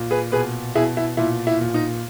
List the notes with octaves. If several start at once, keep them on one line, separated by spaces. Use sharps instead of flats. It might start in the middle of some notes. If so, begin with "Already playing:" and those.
Already playing: A#2
G#4 B4
B2 G#4 B4
B2 E4 G#4
E4
A#2 E4
E4
A#2
D#4